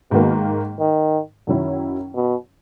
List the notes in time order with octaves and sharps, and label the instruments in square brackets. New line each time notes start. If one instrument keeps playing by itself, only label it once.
[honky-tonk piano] G#2 D#3 A#3 [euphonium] B2
[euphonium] D#3
[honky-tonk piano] F#2 D#3 F#3 C#4 E4
[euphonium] B2